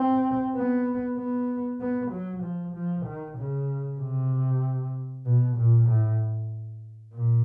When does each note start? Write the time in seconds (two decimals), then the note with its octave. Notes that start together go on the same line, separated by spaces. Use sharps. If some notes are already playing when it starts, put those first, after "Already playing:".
Already playing: C4
0.56 B3
1.18 B3
1.81 B3
2.12 F#3
2.43 F3
2.75 F3
3.06 D#3
3.38 C#3
4.00 C3
5.26 B2
5.57 A#2
5.88 A2
7.13 A#2